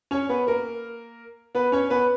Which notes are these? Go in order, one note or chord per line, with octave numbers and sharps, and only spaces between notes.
C#4 C#5
B3 B4
A#3 A#4
B3 B4
C#4 C#5
B3 B4